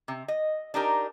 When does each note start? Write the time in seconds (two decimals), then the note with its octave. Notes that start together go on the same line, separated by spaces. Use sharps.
0.08 C3
0.28 D#5
0.74 D4 D#4 G4 A#4